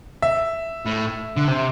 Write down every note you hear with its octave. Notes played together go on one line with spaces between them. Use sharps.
E5
A2
D3
C3